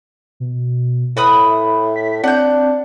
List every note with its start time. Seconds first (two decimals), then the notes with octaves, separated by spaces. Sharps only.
0.40 B2
1.17 A2 B4 B5 D#6
1.45 E5
1.96 B6
2.24 C4 D4 F#5 G6